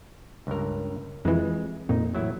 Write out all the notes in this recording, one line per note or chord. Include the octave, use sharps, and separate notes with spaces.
C#2 G2 A#4
F2 E3 G#3
F2 A#2 D#4
A1 F#3 E4